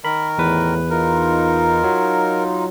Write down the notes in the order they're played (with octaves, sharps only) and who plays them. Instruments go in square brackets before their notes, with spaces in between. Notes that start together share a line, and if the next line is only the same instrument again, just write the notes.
[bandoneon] D#3 A#4 [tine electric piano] B5
[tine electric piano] E2 B4 [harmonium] A2
[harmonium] D#4 F4 [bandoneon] A#4
[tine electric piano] F#3